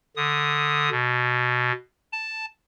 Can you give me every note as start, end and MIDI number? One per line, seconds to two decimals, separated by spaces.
0.16 0.90 50
0.16 0.90 87
0.91 1.72 47
2.12 2.46 81